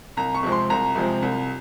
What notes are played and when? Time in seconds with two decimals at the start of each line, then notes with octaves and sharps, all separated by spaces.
0.17 C2 A#5
0.35 C#6
0.43 C3 F3 G#3 C4
0.52 C6
0.70 C2 A#5
0.95 C3 F3 G#3 C4
1.22 C2